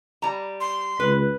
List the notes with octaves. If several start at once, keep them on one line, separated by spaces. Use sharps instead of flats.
G3 A#5
C6
C#2 B4